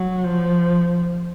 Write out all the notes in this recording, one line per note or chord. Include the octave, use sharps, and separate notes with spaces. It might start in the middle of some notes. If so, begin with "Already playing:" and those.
Already playing: F#3
F3